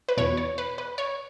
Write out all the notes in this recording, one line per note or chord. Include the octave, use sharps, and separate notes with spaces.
B4
E2 B2 C#5
C#5
B4
B4
C#5